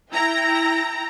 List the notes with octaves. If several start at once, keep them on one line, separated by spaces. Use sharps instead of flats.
E4 G5 A#5 A#6